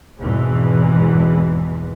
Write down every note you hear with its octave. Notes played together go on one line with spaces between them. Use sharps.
G#1 E2 B2 E3 G#3